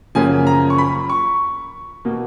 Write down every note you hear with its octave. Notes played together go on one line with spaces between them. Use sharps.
F#2 C#3 F3 A#3 G#5
A#5
C#6
B5
C#6
B2 A#3